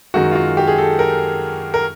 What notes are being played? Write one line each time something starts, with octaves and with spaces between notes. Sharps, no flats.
F#2 D#3 G#3 F#4
F4
F#4
G4
G#4
A4
A#4
A#4